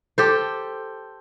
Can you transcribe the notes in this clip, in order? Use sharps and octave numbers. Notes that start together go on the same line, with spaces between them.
G4 A4 C5